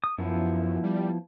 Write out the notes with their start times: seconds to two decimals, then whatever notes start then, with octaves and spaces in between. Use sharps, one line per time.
0.04 D#6
0.18 F#2 F3 B3 E4
0.84 G3